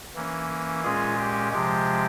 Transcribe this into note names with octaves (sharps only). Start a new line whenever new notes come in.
E3 A#3 C#4
A#2 G#3 C#4 F4 G#4
G4
C3 F3 G#3 G4